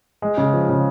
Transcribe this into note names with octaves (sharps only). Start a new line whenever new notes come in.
G#3
C#3
F3
C#3